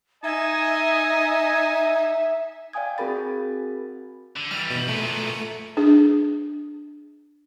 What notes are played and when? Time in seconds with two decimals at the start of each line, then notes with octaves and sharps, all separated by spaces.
0.24 D#4 D#5 E5 G#5
2.73 D5 F5 G5 G#5 D#6 G#6
2.98 C4 F#4 G#4 A#4 B5 A6
4.36 D3
4.51 E3 G3 F6
4.70 B2
4.88 A#2 A3 B3
5.77 D4 G#4